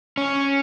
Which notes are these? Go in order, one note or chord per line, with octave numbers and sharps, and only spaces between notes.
C#4